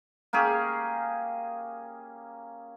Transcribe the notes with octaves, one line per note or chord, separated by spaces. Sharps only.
A#3 C#4 G4 G#4